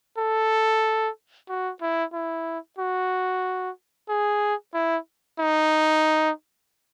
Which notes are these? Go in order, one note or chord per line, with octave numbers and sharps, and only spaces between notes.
A4
F#4
E4
E4
F#4
G#4
E4
D#4